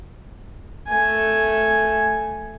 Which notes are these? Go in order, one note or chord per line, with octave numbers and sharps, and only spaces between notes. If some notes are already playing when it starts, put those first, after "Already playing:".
A3 G#5